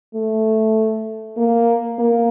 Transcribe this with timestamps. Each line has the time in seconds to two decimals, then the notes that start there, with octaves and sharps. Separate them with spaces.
0.14 A3
1.37 A#3
1.99 A#3